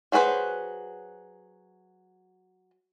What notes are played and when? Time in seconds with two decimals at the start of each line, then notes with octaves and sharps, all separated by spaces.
0.12 F#3 F#4 G#4 B4 C5